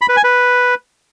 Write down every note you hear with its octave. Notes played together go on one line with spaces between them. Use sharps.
B5
B4
G#5
B4